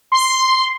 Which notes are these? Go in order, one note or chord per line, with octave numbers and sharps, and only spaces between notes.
C6